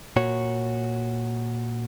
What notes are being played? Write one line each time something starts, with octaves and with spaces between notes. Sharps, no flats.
A#2 F#4 C#5